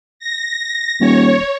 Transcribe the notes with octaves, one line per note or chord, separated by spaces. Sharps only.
A#6
D#1 C#5